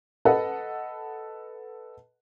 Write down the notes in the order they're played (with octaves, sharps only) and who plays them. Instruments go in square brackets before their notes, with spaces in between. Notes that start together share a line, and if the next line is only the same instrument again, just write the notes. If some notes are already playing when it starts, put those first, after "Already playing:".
[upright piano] A4 B4 D#5 F#5